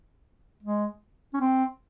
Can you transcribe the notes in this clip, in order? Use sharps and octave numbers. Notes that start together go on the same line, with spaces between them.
G#3
C#4
C4